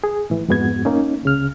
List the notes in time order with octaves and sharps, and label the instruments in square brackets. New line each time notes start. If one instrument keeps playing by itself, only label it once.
[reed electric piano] G#4
A2 E3
F2 G#2 G#3 B3 F#4 G#6
A#3 C#4 D#4
C#2 C#3 F6